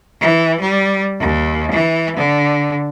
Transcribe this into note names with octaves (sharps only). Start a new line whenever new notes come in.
E3
G3
D#2
E3
D3